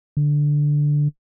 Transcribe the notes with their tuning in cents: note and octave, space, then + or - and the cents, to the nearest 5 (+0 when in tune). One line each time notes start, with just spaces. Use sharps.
D3 +0